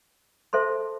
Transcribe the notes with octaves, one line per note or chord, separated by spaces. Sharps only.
A4 C5 E5 A5 C6